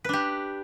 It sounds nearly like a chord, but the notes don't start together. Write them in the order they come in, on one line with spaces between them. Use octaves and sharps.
B4 D4 G4